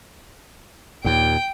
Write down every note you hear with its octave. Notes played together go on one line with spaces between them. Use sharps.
D#2 A#2 G5